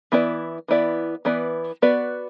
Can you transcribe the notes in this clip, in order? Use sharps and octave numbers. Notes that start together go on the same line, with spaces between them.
E3 B3 E4 B4 D5
E3 B3 E4 B4 D5
E3 B3 E4 B4 D5
B3 F#4 B4 D5